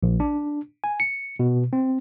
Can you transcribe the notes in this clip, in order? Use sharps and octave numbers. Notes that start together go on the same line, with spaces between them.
A#1
D4
G#5
C#7
B2
C4